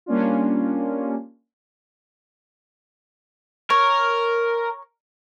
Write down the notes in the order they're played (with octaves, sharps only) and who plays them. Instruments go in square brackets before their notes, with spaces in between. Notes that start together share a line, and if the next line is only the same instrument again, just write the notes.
[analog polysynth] G3 A#3 C#4 D4 F4
[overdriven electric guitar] A#4 [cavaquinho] C#5